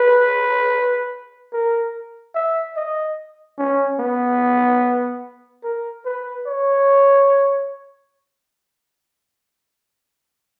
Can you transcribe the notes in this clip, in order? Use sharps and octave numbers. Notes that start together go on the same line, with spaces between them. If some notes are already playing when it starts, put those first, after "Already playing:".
Already playing: B4
A#4
E5
D#5
C#4
B3
A#4
B4
C#5